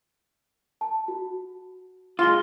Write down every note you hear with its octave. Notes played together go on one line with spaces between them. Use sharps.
A5
F#4
G#3 F4 F6 G7